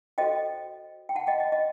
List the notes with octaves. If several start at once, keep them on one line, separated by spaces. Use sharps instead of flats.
F#4 A4 C5 D#5 G5
G5
F#5 A5
D#5 G5
D#5
D#5